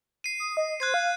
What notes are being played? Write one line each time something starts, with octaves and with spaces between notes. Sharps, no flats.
C7 D#7
D#6
D#5
C5 F#6 G#6 C7
F5